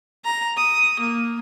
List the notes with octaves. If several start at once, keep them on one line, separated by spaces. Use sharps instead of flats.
A#5
D#6
A#3